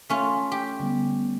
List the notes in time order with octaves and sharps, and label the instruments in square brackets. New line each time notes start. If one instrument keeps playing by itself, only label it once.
[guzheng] A3 C#4 F4
G4
[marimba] D3 G3 B3